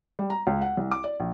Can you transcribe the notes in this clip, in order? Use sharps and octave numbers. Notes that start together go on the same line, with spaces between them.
G3
A#5
C#2
F#5
C2
D6
D5
A#1